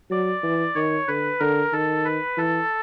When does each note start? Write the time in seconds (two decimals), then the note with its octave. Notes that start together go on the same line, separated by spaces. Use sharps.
0.10 F#3 D5
0.43 E3
0.75 D#3 C#5
1.08 D3 B4
1.40 D3 A#4
1.73 D#3 A4
2.05 B4
2.37 E3 A4